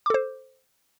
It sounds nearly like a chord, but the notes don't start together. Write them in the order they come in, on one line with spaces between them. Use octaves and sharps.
D6 A4 C5